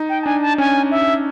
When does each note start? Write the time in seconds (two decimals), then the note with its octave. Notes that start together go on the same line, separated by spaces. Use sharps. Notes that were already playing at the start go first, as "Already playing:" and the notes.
Already playing: D#4
0.09 G5
0.22 A5
0.26 D4 G#5
0.42 A5
0.58 C#4 G#5
0.91 E5